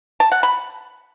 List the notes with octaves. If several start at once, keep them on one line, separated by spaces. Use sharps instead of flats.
A5
F#5
B5